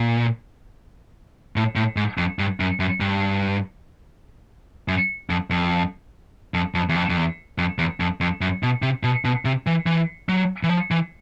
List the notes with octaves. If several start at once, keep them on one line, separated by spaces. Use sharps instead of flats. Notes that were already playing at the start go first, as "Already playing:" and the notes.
Already playing: A#2
A2
A2
G#2
F2
G2
F#2
F#2
G2
F#2
F2
F2
F2
F2
E2
F2
F2
E2
F2
E2
F2
F2
F#2
B2
C3
B2
B2
C3
E3
E3
F#3
E3
F3
E3